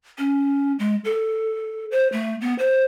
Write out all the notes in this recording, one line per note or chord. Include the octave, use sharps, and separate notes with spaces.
C#4
G#3
A4
C5
A3
B3
C5